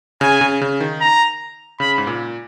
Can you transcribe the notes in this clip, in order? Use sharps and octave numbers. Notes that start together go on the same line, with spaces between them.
C#3 G#5
C#3
C#3
D#3
A#5
C#3 B5
G#2
A#2